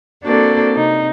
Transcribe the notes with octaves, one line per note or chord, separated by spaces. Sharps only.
A#3 C4 D4 F#4 A4 D5
C3 D#4